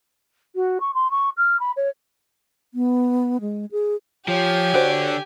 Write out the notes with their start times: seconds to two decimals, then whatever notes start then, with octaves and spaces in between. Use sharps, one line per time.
0.55 F#4
0.80 C#6
0.94 C6
1.11 C#6
1.37 F6
1.59 B5
1.76 C#5
2.74 B3
3.41 G#3
3.72 G#4
4.28 F3 G4 C#5 G#5
4.74 D3 F#4 C5 D5